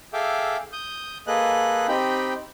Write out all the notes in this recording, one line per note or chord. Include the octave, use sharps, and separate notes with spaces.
G#4 A4 E5 F5 G5 D6
D#6 G6
A#3 G#4 A4 B4 D#5 F#6
C4 D#4 G4 G5 B5